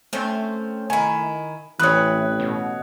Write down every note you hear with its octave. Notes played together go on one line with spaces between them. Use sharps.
A3 C4 C#4 C5
D#3 E4 G#5
A1 E3 C4 B4 C#5 D#6 F#6
B2